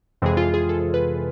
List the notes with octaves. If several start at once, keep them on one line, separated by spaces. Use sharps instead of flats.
F2 C3 E3 G#3 G#4
F4
G#4
A4
B4